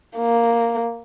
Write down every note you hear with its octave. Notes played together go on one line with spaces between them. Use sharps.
A#3